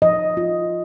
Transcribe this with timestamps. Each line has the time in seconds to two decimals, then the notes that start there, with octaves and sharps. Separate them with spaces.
0.02 F3 D#5
0.37 F4